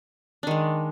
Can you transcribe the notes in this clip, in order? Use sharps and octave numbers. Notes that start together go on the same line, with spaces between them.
D#3 G#3 D4